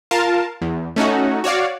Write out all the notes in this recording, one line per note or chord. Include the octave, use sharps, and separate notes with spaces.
F4 A#4 F5 A5
E2
A3 C#4 D#4 F#4
F#4 C#5 D5 F5